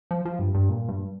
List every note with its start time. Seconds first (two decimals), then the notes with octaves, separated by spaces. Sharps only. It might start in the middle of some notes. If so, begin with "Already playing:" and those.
0.11 F3
0.25 F3
0.39 G2
0.55 G2
0.69 A#2
0.88 G2